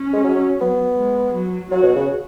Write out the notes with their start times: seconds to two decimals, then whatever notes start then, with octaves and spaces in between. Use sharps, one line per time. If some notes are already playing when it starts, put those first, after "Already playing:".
Already playing: C#4
0.13 G#3
0.24 F#3
0.61 F#3 B3
0.98 G#3
1.34 F#3
1.71 F#3 F#4
1.83 B2
1.96 C#3